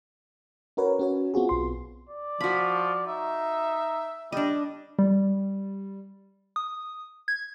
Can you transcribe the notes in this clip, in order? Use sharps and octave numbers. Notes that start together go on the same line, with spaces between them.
C#4 F#4 A#4 B4 C#5
C#4 F#4 C#5
B3 C4 F4 F#4 G#4
B1 C6
D5
F3 F#4 B5
D#4 E5
G3 D4 D#5
G3
D#6
G#6